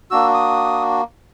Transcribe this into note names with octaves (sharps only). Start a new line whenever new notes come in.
A#3 D4 F#4 E6
D#6